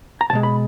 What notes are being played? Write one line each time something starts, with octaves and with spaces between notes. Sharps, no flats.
A#5
B1 B2 G#3 A5
B5